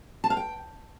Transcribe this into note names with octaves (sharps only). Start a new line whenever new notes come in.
A5
F5
G5